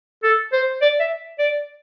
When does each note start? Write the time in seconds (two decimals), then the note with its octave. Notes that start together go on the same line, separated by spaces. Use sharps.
0.24 A4
0.53 C5
0.82 D5
1.00 E5
1.39 D5